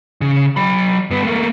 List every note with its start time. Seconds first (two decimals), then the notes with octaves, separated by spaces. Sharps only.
0.21 C#3
0.56 F#3 B5
1.10 G2 B3
1.23 A3 A#3